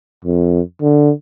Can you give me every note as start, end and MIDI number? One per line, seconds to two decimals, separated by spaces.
0.24 0.61 41
0.82 1.11 50